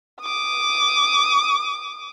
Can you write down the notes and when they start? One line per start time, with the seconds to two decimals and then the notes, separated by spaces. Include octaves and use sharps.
0.21 D6 D#6